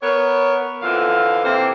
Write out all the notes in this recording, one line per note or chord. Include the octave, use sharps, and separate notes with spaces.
B3 A#4 C#5
F2 D3 E3 F4 F5
C3 E3 A#3 A4 C5